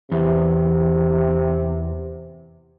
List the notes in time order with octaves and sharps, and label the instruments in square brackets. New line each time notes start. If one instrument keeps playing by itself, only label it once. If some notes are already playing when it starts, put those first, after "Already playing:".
[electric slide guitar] E2 [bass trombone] C3